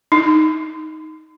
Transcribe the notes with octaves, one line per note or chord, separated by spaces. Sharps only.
D#4